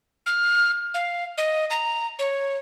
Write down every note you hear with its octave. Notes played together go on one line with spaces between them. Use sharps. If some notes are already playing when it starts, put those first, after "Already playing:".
F6
F5
D#5
A#5
C#5